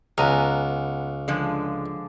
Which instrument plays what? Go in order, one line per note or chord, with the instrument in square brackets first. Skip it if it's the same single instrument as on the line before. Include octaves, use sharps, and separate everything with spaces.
[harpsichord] C#2 [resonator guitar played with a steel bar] B3 G#5 A#5
[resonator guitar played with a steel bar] D3 F3 G#3